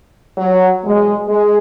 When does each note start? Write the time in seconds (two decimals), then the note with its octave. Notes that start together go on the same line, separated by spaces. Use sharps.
0.38 F#3
0.83 E2 B2 F#3 G#3
1.28 G#3